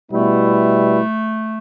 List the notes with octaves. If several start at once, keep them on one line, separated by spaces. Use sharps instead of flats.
B2 G3 A3 B3 E4